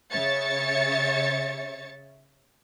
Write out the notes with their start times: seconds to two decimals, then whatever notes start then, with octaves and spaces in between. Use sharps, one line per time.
0.11 C#3 C#5 E5 A6 C#7